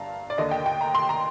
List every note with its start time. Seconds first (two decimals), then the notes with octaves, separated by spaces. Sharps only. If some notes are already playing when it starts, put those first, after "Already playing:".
Already playing: G1 G2 F5 A5 A#5
0.30 D5
0.38 D#2 D3 D#5
0.51 G5
0.66 G5
0.81 A#5
0.95 C6
1.09 A#5